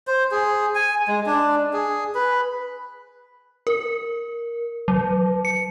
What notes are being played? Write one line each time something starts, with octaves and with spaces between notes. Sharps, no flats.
C5
G#4
G#5
G#3
D4
G#4
B4
A#4
F#3
C#7